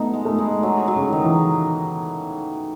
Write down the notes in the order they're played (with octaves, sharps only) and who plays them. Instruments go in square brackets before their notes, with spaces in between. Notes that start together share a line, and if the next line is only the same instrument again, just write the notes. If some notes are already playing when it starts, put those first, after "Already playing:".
Already playing: [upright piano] A3 B3 [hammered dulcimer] D#4
[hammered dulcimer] G#3
[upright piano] A3
[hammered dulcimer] G#3
F#3
F#3
[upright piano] C#3
[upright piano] D#3 [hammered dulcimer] D#4
[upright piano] E3